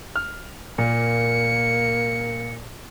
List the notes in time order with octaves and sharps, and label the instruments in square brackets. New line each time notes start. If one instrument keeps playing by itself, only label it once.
[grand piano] F6
[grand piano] A#2 [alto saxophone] A#3 [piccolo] C#7